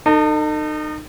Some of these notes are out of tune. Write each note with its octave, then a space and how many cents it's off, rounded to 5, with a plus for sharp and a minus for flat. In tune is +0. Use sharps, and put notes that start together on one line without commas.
D#4 -30 A4 +35